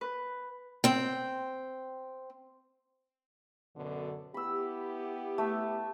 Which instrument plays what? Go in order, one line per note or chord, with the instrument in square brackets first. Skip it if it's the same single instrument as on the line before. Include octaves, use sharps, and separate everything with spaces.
[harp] B4
[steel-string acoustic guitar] C4 G5
[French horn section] F#2 B2 D3
[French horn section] B3 E4 G4 [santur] B5 E6
[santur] A3 E5